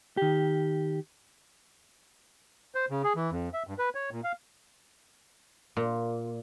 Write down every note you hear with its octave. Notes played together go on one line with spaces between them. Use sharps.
D#3 G4
C5
C#3
G#4
E3
F2
E5
G2
B4
C#5
A#2
F5
A#2